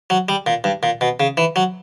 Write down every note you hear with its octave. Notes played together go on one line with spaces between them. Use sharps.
F#3
G3
A#2
G2
A#2
B2
C#3
E3
F#3